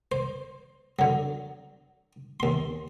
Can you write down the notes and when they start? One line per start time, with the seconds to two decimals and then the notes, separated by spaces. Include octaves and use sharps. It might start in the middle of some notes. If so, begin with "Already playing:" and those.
0.12 C5
0.99 D3 F#3
2.40 D#2 C6